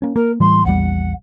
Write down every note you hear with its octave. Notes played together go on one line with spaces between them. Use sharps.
A#3 C#4
A#3 A#4
A2 E3 G3 C6
A#1 E2 G3 F#5